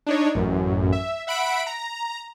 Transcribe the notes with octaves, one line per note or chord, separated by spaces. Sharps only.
D4 D#4 C#5
A1 F#2
E5
E5 F#5 B5 B6 D7
A#5